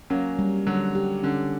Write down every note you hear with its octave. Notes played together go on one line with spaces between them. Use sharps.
F#3 A#3 C#4
G3
D3 F#3 G3
G4
D3 C#4